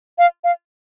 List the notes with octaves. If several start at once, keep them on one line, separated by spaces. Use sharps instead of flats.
F5
F5